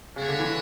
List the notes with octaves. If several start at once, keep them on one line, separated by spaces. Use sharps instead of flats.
C#3 D4 F#4 C#5 E5
D3
E3